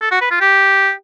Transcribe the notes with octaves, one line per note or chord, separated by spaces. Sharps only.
A4
F#4
B4
F4
G4